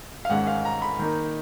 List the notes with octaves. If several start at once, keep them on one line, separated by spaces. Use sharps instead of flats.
F5
G#2 D#3 G#3 C#4 F#5
F5
A#5
B5
D#3 A#3 D#4